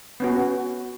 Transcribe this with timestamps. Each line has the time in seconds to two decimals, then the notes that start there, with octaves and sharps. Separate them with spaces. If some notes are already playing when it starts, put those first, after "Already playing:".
0.20 B3 C#4 F#4